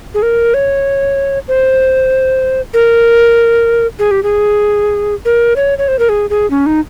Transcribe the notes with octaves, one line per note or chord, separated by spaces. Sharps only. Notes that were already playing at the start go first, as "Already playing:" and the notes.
G#4
A#4
C#5
C5
A#4
G#4
G4
G#4
A#4
C#5
C#5
C5
A#4
G#4
G#4
C#4
D#4